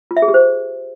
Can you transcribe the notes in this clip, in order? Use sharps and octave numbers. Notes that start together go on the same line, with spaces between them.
F4
E5
G#4
G4
C5